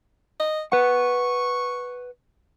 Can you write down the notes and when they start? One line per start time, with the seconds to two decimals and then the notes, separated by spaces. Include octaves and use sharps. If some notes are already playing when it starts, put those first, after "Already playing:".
0.39 D#5
0.72 B4 F#5 C#6